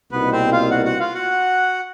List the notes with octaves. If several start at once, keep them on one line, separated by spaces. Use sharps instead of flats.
C2 B2 G3 A#3 B3 D#4 B4
C4 C5
F4 F5
F#4 F#5
F#4 F#5
F4 F5
F#4 F#5